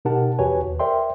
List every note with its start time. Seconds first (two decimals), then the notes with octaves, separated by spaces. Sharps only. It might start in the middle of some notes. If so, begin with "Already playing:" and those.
0.05 B2 D#4 G4 A#4 F#5 A5
0.39 E2 F#4 G4 B4 C#5 G#5
0.64 D#2
0.79 A#4 C5 D5 E5 G5 C6